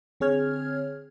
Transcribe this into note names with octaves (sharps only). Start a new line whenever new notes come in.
D3 C4 G#4 C#5 F6 G#6